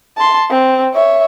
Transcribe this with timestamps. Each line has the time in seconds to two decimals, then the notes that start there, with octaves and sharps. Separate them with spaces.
0.17 A5 C6
0.50 C4
0.94 C#5 E5